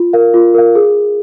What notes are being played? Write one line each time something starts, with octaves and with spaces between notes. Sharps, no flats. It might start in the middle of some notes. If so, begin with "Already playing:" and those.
Already playing: F4
A#4 F5
F4
A#4 F5
G#4